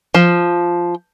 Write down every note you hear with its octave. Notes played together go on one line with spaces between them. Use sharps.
F3